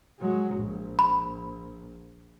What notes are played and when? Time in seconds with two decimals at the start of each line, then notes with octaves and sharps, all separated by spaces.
0.19 F#3 G#3
0.57 A#1
0.99 B5